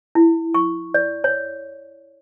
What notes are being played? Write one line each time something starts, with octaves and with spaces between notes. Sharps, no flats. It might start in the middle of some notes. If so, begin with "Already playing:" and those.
E4
C#6
D5
C#5